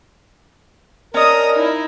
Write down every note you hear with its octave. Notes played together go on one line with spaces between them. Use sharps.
C#4 D4 A#4 D#5 A#5 D#6
D#4 E4